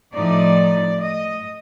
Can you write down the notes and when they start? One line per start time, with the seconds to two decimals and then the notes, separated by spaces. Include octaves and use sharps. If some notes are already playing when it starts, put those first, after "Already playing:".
0.13 A2 F3 A3 D#4 D5
1.02 D#5